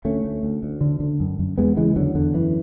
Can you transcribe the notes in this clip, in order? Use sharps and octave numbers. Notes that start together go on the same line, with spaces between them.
D2 A3 C#4
D2
D2
D2
D3
D3
F#2
F#2
E2 G#3 B3
C#3 E3 G#3
E2 D3 F#3
E2 D3
F#2 E3